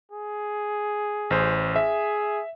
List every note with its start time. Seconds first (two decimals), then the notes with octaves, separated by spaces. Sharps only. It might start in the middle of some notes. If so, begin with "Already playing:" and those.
0.12 G#4
1.31 A1 C5
1.76 G#4 E5